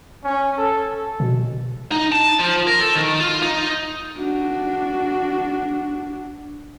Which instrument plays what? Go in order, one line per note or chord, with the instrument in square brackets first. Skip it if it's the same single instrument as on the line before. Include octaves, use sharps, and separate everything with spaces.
[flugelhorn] C#4
A4
[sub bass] B2
[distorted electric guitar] D#4
A5
F3
A#4
A4
D#3
F4
D#4
[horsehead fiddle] D4 F#4